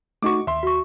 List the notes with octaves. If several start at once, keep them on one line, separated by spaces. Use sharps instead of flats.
A3 D#4 F#4 C#6 D6
D#2 E5 C6
F#4 C#6